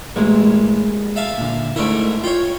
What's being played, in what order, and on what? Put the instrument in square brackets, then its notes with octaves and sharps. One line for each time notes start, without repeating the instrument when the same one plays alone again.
[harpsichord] A1 [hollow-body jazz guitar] G#3 A#3 E4
[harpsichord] E5 F5 A5
[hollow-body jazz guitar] A#2 D3
[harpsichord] G#2 A3 A#4 [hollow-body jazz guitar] E4 D5
[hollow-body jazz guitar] F4 [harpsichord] C#5 G5